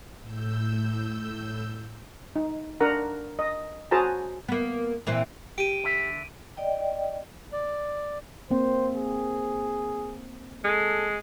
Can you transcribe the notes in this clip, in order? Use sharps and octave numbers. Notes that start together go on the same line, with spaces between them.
A2 E6 G6
D#4
D4 A#4 F#5 A#5
D#5
F#4 G#4 C5 A5 A#5
A#3 B3
A#2 E3 C4
G4 D7 D#7
D3 E5
D5 D#5 G5
D5
A#3 C4 C5
G#4
G#3 A4